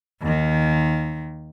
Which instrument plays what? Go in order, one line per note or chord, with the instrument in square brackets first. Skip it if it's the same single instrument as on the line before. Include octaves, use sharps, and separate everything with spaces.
[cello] D#2 D#3